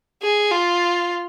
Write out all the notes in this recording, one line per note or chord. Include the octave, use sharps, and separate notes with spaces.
G#4
F4